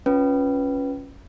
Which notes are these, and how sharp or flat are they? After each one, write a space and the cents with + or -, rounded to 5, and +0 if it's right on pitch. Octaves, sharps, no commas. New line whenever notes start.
C#4 +0 F4 +0 B4 +0